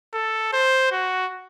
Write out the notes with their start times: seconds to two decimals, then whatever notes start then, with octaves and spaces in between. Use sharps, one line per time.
0.14 A4
0.53 C5
0.92 F#4